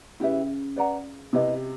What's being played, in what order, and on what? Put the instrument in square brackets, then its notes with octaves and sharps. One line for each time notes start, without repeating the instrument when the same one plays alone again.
[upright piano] C#3 [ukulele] E4 G4 B4 E5
[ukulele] B4 D5 F#5 A#5
[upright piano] C3 [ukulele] E4 G4 B4 D#5